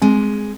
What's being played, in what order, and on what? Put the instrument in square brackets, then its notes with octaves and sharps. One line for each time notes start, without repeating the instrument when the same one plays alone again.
[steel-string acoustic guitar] G#3 [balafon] C4